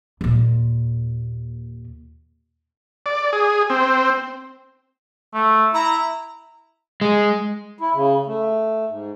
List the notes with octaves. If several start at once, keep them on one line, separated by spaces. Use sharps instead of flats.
D#2 A#2
D5
G#4
C4
A3
E4 A#5
G#3
E4
C#3
A3
G#2